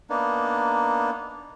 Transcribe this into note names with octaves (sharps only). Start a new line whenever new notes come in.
A#3 B3 D4 D#4